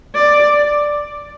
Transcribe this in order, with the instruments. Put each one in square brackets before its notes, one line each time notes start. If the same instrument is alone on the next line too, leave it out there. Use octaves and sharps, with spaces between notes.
[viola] D5